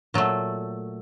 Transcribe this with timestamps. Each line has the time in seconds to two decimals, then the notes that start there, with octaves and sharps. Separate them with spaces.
0.14 A#2 F#3 A3